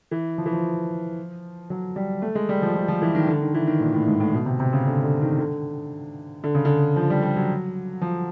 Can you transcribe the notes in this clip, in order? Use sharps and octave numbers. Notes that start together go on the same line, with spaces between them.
E3
F3
E3
F3
F#3
G3
A3
G#3
G3
F3
F3
F3
E3
D#3
D3
D#3
E3
D#3
A#2
A2
G#2
A2
B2
C3
C3
C#3
D3
D3
D#3
D3
D3
C#3
D3
F3
G3
G3
F#3
F3